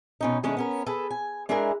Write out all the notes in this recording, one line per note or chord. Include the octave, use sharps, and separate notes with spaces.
B2 C#4 D#4
B2 D#3 G#3 A3 C#4 D4
B3 C#4 A#4
G#4 A4 B4
G#5
G#3 D4 E4 G#4 A#4